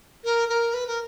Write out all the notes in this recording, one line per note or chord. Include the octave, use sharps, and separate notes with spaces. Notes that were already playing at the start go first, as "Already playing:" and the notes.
A#4
A#4
B4
A#4